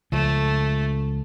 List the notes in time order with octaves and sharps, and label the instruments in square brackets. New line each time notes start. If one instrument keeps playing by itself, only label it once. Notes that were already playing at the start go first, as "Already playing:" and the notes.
[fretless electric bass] C#2 F3 [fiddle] A3